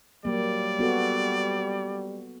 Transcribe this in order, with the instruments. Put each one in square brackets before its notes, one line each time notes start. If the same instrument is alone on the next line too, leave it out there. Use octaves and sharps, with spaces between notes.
[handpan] F#3 A#3 [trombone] G3 [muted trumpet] D5
[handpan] B3 F#4 A4